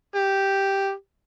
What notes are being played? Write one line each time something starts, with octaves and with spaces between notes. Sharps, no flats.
G4